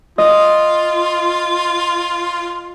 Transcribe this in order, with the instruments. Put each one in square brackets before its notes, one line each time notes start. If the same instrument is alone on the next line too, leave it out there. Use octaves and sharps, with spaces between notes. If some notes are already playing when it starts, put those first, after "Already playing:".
[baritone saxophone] F4 [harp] D#5